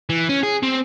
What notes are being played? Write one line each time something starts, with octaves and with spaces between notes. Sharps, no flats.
E3
C#4
G#4
C4